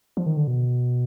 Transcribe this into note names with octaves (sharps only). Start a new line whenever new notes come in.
F3
D#3
D3
B2